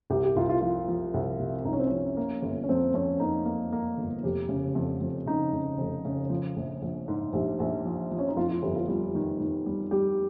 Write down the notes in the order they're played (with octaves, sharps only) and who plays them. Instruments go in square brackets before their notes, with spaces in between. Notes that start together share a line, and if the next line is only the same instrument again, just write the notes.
[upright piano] C2 [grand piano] G4
[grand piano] G4
[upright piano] C2 [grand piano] F4
[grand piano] F4
[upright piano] F3 [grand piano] F4
[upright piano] F3
C2
C3
[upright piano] C2 [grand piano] D#4
[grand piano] C#4
C4
[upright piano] F3 [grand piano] C#4
[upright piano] A#3
G1
[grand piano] C#4
[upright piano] F2 [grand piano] C4
[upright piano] F2 [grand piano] C#4
[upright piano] A#3 [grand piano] D#4
[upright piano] A#3
A#3
G1
[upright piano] F1 [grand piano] G4
[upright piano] C#3
F2
F2
[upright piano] C#3 [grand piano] D#4
[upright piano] C#3
F1
C#3
F3
A#1
A#1
G#2
[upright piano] A#1 [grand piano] G4
[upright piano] A#1
F3
F3
[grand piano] C#4
D#4
[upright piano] F2 [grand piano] F4
[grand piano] F4
[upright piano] G1 [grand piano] G4
[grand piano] F4
[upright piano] G3 [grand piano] F4
[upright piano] D#3
D#3
G3
[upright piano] G3 [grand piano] G4